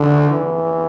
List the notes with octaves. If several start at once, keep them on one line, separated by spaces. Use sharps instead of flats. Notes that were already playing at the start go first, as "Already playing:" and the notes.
Already playing: D3
E3